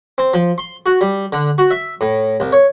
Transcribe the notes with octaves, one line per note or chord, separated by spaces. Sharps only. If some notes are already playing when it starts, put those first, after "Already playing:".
C4
F3
C6
F#4
G3
D3
F#4
E5
A2
C2
C#5